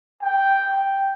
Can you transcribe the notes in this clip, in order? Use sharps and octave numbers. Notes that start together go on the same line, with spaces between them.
G5